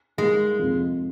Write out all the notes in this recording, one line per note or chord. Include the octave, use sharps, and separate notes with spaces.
G#2 G3 G#3 A#3 D#4 G4
F2 C3 F3